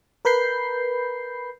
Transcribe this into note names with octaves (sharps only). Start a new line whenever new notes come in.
A#4 B4 B5 G6 C7